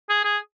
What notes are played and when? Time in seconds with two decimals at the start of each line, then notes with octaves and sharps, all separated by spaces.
0.09 G#4
0.24 G#4